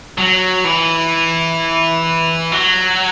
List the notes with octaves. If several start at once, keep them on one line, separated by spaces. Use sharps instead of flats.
F#3
E3
F#3